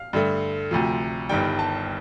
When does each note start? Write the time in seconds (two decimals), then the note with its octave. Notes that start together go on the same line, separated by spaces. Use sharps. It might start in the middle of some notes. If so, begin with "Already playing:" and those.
Already playing: F5
0.13 G2 D3 A3
0.71 D2 C3 F3
1.29 G1 G2 D#3 G3 G5
1.59 A5